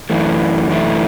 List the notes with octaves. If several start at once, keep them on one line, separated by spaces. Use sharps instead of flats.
F#2 E3 A3
F#2 E3 A3